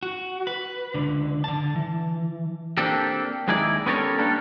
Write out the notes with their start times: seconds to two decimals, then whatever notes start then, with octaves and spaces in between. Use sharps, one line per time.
0.03 F#4
0.47 B4
0.94 C#2 D3
1.44 D3 A5
1.76 E3
2.78 A#3 C4 D4 G4 A4
3.48 D#2 G#3 D#4 E4 D5
3.86 B3 C#4 G4 A4 A#4 C#5
4.18 G3 A#3 D4 A4